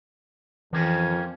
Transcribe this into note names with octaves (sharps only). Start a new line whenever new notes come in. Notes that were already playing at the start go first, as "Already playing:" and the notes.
F2 E3 A#3 C4 C#4